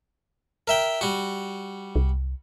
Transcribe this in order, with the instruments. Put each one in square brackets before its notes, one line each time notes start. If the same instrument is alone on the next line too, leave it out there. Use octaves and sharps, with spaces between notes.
[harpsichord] A#4 E5 G5
G3 F#4
[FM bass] C2